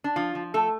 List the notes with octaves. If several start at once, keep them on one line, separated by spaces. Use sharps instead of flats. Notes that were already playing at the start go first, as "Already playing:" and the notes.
D4
F3 F4
F3
A3 A4